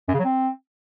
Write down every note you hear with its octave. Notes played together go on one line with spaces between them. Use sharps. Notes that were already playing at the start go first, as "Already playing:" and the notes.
F#2
C#3
F#3
C4